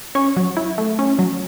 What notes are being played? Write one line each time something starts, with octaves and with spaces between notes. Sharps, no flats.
C#4 C#6
F#3
E4
A3
C#4
F#3